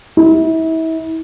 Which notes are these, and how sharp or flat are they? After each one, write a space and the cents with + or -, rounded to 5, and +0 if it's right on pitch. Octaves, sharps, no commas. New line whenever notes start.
E4 -35